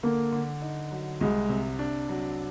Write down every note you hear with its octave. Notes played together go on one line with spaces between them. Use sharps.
D3 A#3
D3
D#4
F#3
C2 G#3
C3
D4
F#3